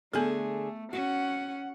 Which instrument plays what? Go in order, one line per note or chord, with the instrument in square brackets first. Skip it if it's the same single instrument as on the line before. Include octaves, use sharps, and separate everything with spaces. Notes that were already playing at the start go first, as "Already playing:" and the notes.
[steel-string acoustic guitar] D3 G#4 [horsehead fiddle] A3 [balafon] B3 A4
[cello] C#4 [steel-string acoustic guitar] F#4 [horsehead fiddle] F#5